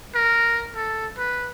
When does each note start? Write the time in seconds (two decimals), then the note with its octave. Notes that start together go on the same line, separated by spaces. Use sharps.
0.15 A#4
0.76 A4
1.18 B4